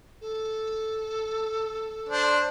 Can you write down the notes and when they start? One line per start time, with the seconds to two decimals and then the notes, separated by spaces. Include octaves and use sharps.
0.21 A4
2.09 D4 C5